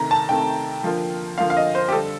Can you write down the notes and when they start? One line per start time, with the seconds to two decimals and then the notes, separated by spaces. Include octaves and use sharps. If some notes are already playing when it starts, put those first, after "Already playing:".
Already playing: C3 D#3 A3 A#5
0.11 A5
0.29 C3 D#3 A3 G5
0.83 D3 F3 A#3 F4
1.38 D3 F3 A#3 F4 F5
1.50 F5
1.57 D#5
1.75 C5
1.88 G4
1.92 D3 G3 A4